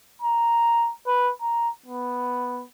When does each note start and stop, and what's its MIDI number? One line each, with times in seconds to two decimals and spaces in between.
0.22 0.91 82
1.07 1.31 71
1.41 1.68 82
1.86 2.64 59